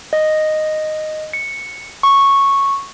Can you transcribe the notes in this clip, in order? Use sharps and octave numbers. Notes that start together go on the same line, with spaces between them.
D#5
C#7
C#6